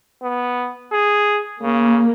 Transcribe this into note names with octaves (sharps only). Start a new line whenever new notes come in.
B3
G#4
C#3 A#3